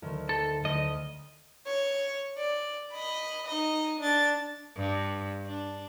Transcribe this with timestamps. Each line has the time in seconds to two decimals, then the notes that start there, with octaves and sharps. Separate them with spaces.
0.02 D2 D#3
0.29 A4
0.65 D2 D#5
1.66 C#5
2.38 D5
2.92 D#5 B5
3.46 D#4 D#5
3.99 D4 A6
4.76 G2
5.46 D4